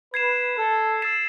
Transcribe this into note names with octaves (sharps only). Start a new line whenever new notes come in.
B4 G#6 C7 E7
A4
E6 A6 C7 E7